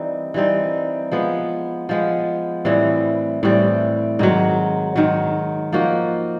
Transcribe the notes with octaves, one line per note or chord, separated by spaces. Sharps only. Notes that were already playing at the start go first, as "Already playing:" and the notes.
Already playing: E3 G3 C4 D#4
E3 G3 C4 D#4
F3 G#3 B3
F3 G#3 B3
A2 E3 G3 C4
A2 E3 G3 C4
G#2 D#3 F#3
G#2 D#3 F#3
F3 A#3 D#4 F#4